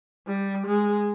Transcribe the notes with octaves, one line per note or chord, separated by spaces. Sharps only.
G3
G#3